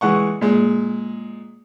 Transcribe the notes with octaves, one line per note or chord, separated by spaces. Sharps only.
E3 G#3 F#5 C#6
A#2 G#3